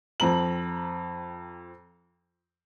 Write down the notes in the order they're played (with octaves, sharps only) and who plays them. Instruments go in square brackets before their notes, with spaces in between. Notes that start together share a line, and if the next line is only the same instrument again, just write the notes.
[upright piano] F2 C4 A#5 F#7